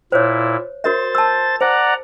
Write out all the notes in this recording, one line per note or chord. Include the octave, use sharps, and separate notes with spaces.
A#2 E4 C5 C#5
F#4 A#4 C5 E5 A6
A5 E6
C5 D5 F#5 A#5